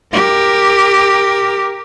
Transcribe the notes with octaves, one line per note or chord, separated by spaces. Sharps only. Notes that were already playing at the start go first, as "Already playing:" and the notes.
G4 A#4